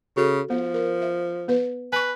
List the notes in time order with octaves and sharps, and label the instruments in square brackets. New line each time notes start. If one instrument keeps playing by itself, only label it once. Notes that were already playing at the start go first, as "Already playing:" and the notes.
[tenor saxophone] C#3 [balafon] F#4 A4
[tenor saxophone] F3 [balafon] B3
[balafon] A#4
E5
B3 B4
[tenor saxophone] B4 [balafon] G#5 C#6